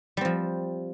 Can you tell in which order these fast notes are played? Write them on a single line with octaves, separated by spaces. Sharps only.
G3 C4 F3